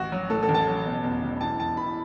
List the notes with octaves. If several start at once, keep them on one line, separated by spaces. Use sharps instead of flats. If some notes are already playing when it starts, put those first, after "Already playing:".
Already playing: A1 F#4
F#3
A2 A4
A4
A1
A5
F#3
B2
E2
E1
E3 A5
E2 A5
E3 B5